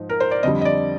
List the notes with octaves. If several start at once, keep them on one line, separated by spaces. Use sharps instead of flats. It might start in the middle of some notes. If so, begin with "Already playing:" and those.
Already playing: G#2 F3 D#4
A#4
C5
D5
F2 D3 G3 D#5
D#5
D5